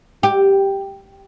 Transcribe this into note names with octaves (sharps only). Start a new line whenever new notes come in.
G4